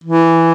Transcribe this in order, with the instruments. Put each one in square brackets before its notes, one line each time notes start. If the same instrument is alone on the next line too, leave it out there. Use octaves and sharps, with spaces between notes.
[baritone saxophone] E3